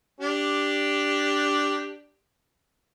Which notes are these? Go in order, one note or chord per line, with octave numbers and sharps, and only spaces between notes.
D4 G4